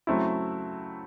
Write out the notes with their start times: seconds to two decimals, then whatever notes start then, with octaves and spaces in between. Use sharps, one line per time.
0.07 C#3 F#3 A3 C4 E4